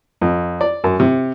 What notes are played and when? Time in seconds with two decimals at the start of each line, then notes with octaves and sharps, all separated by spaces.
0.21 F2
0.61 D5
0.84 F#2
1.00 C3